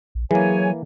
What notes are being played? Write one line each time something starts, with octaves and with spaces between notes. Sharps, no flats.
A#1
E3 F#3 A#3 G#4 C#5 G#5